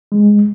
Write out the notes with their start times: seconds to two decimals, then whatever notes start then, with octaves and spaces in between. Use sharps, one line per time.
0.12 G#3